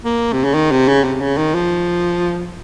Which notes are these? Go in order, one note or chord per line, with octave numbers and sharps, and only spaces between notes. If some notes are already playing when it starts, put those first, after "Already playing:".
A#3
C3
C#3
D#3
C3
C#3
C3
C#3
D#3
F3